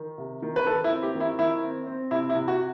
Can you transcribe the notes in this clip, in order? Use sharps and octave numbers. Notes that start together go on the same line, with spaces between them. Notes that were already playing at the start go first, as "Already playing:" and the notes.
Already playing: D#3
C3
D#3
B4
D#3 A4
E4
C4
G4
D#3
E4
D#3 E4
C4
C4
C3 E4
E4
C3
F#4